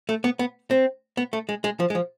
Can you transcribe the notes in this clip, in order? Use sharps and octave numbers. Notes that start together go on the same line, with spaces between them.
A3
B3
B3
C4
B3
A3
G#3
G#3
F3
G#3
F3